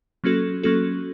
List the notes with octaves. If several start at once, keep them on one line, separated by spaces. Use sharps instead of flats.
F#3 A#3 C#4 F#4 A4
F#3 A#3 C#4 F#4 A4